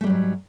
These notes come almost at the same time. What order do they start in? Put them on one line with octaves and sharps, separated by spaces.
A3 G3 F#3 G#2